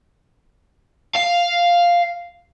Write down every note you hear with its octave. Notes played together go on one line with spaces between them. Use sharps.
F5